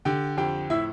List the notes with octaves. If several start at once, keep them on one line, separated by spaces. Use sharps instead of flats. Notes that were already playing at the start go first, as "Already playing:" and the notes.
D3 G4 G5
F2 G4 G5
A2 E4 E5